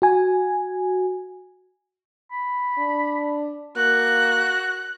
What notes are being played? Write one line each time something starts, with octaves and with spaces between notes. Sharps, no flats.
F#4 G#5
B5
D4
A#3 F#4 F#6